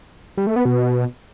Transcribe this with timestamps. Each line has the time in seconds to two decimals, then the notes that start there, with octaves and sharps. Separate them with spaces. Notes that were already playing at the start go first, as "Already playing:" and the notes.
0.37 G3
0.47 A3
0.56 B3
0.65 B2